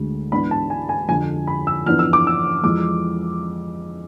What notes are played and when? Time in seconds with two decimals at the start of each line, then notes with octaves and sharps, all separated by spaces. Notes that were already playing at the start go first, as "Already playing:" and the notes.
Already playing: D2 D3 G#3
0.32 G#2 E3 B3 D4 B5
0.51 A5
0.70 G#5
0.89 G#5
1.09 F2 D3 F3 G#5
1.47 B5
1.67 E6
1.86 F2 E3 B3 D4 F6
1.99 E6
2.13 D6
2.27 E6
2.63 F2 E3 G#3 D6